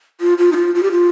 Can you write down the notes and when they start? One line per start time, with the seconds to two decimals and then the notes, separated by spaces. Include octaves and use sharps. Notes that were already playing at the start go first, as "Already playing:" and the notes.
0.21 F4
0.38 F4
0.52 D#4
0.56 F4
0.75 F4
0.83 G4
0.91 F4